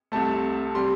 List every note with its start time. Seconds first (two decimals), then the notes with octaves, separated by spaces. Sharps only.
0.12 C2 C3 A3 A5
0.75 C3 G3 C6